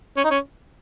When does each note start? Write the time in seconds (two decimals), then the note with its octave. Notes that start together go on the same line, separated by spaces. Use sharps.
0.17 C#4
0.24 D#4
0.31 C#4